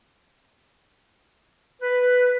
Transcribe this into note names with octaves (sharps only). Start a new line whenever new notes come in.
B4